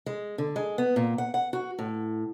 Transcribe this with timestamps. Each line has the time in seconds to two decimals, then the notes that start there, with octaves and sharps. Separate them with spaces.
0.06 G#3
0.38 D3
0.56 G#3
0.78 B3
0.96 A#2
1.18 F#5
1.34 F#5
1.53 F#4
1.79 A2